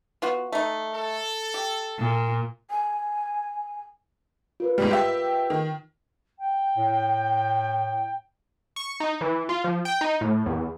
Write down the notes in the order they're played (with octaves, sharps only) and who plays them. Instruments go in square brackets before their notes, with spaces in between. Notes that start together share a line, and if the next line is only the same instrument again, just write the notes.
[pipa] B3 F4 F#4
A3 D#4
[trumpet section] A4
[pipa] G4
[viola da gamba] A#2
[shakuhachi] G#5
[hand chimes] F4 A#4 B4
[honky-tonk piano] G#2 B2 G3
G4 E5
D#3
[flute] G5
[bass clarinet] A2
[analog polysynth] C#6
D#4
E3
F4
F3
G5
D#4
A2
E2